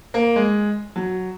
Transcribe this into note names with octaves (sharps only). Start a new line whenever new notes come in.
A#3
G#3
F#3